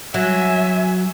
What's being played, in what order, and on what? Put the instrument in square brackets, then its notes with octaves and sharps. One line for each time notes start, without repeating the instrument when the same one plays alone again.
[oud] F#3 [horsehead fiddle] E5 G#5